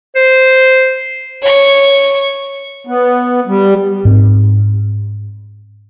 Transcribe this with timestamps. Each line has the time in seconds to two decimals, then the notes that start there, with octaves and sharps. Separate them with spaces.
0.16 C5
1.42 C#5 C#6
2.87 B3
3.47 G3
4.05 G#2 C4